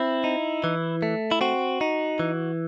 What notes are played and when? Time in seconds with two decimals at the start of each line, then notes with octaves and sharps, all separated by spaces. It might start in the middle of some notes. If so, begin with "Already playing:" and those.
Already playing: C4 E4
0.24 D#4
0.64 E3
1.02 A3
1.31 E4
1.41 C4 F#4
1.81 D#4
2.19 E3